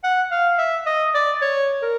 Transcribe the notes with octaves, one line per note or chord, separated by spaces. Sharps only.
F#5
F5
E5
D#5
D5
C#5
A#4